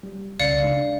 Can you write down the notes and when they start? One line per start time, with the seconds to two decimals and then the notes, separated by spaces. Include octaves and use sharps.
0.03 G3
0.40 C#2 C#3 D5 F5 C#7
0.63 G#3 D4